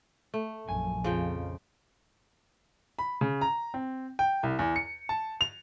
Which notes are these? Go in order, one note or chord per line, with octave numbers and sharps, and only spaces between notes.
A3
A#1 F#2 G#5
F2 C#3 F3 G5
B5
C#3
A#5
C4
G5
C2
E2
C#7
A5
F7